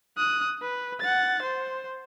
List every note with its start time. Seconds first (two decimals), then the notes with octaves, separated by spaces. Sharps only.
0.17 D#6 F#6
0.62 B4
1.00 F#5 A6
1.42 C5